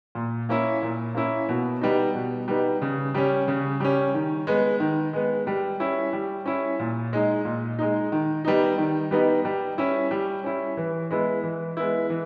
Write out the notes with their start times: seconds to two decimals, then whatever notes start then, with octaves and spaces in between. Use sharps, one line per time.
0.15 A#2
0.49 A#3 C#4 E4
0.82 A#2
1.15 A#3 C#4 E4
1.49 B2
1.81 G3 B3 D#4
2.15 B2
2.48 G3 B3 D#4
2.82 C#3
3.14 G3 C#4
3.48 C#3
3.80 G3 C#4
4.14 D#3
4.47 G#3 B3
4.80 D#3
5.13 G#3 B3
5.47 G3
5.80 C#4 E4
6.13 G3
6.45 C#4 E4
6.79 A#2
7.13 G#3 D#4
7.45 A#2
7.79 G#3 D#4
8.12 D#3
8.44 G3 B3 D#4
8.78 D#3
9.11 G3 B3 D#4
9.45 G3
9.78 C#4 E4
10.11 G3
10.44 C#4 E4
10.77 E3
11.11 G#3 B3 E4
11.43 E3
11.77 G#3 B3 E4
12.10 E3